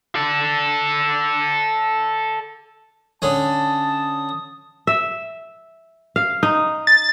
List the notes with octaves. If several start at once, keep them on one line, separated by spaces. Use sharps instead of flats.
A4 D5
D3 C#4 A5 D#6
E5
F5
D#4
A6